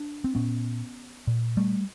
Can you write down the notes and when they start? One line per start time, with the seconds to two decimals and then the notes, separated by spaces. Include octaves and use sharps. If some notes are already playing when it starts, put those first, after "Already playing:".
Already playing: D4
0.24 C4
0.35 A#2 B3 C#4
1.27 A#2
1.57 G3 A3